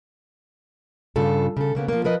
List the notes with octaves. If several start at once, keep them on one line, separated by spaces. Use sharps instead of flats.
G2 C#3 F4 A4
C#3 A4
C#3 A#3 B3
F3 A#3
F3 A#4 B4 D#5